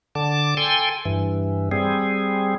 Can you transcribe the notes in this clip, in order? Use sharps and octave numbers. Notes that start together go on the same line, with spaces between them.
D3 A5 D6
A4 G5 G#5 C6
G2 E3
G3 C4 G#4